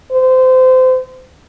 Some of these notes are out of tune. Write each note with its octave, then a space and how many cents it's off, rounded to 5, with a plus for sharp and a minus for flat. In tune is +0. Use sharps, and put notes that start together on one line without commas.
C5 -25